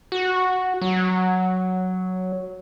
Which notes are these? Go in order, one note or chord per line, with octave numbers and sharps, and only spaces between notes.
F#4
F#3